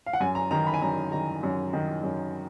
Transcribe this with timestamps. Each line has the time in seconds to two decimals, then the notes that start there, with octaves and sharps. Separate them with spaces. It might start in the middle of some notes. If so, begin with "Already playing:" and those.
0.06 F5
0.13 F#5
0.20 F#2 G#5
0.35 A#5
0.51 D#3 A#5
0.67 B5
0.74 G#5
0.82 F#2 A#5
1.12 D#3 A#5
1.43 F#2
1.73 D#3
2.03 F#2